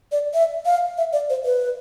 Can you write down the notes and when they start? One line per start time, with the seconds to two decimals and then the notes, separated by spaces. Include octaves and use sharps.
0.12 D5
0.34 E5
0.65 F5
0.98 E5
1.13 D5
1.30 C5
1.45 B4